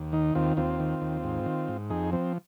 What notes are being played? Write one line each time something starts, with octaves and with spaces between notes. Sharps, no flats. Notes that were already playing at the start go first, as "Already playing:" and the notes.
Already playing: D#2
D#3 D#4
D#2 C4 F4
D#2 C4 F4
D#3
D#2
G#2
D#3
G#2
F2 D#4 G#4
F3 C4